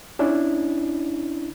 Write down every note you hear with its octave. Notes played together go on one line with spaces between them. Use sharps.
C#4 D4 E4